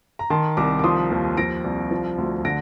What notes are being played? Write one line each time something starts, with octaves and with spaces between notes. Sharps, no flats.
A#5
D#3 A5 C6
C2 A#5 D6
D6
F3 C6 D#6
D#2
F3 A#6 D7
C2
F3
D2
D3 A#6 D7